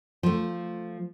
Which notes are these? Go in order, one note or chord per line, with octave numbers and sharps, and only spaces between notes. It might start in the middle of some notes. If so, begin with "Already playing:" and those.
F3 A3